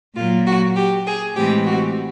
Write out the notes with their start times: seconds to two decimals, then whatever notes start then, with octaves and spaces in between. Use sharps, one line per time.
0.16 A#2 F#3 A#3 F4
0.46 F#4
0.76 G4
1.06 G#4
1.36 A2 E3 G#3 C4 G4
1.66 F#4